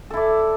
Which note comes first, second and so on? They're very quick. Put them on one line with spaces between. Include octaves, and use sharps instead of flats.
A4 E4 D5